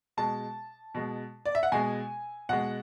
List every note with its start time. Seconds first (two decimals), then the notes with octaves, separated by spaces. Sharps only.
0.17 B2 G#3 A5
0.95 B2 G#3
1.46 D5
1.55 E5
1.63 F#5
1.72 B2 G#3 G#5
2.49 B2 G#3 F#5